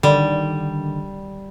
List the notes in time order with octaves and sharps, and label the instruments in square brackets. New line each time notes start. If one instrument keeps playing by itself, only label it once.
[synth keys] D3 D#3 [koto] G3